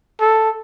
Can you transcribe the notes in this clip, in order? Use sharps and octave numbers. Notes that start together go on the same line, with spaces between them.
A4